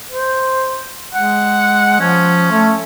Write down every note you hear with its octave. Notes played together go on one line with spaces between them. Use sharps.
C5
G#3 F#5
F3 C#4
A3